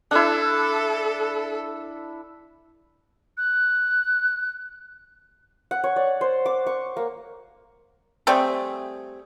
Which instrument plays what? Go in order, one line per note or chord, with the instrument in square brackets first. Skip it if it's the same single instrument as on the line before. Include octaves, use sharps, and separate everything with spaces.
[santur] D4 E4 [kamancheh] A4
[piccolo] F#6
[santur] F#5
C#5
D5
C5
D6
C#6
A#3
[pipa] G3 A3 C4 G#4